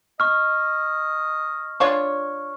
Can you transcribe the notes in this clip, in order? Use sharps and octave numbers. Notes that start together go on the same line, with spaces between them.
D#5 C#6 F6
D4 F4 C#5 C#6